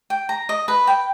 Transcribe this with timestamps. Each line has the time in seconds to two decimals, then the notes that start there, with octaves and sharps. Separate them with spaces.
0.10 G5
0.29 A#5
0.49 D#5
0.68 B4
0.87 G5